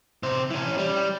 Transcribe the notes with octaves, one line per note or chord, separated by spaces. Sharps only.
C3 C5
E3 C#4
G3